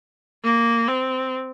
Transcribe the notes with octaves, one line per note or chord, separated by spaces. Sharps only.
A#3
C4